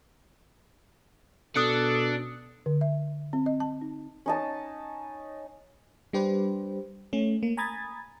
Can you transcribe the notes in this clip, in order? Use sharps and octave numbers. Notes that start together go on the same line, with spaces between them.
B2 D4 A4 D#6 F#6 C#7
D3
E5
C4
D#5
A5
D#4
C#4 D#4 A5
G3 D4 G4 B4 C5
A3 C#4
A#3
G#5 A#5 B5 D#6 G#6 A6